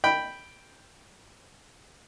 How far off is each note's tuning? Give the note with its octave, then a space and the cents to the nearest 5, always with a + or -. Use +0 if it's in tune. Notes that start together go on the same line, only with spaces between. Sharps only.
G5 +0 B5 +0